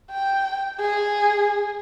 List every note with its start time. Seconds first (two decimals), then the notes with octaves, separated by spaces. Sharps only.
0.11 G5
0.80 G#4